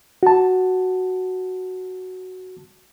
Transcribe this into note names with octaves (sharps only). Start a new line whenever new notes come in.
F#4 A5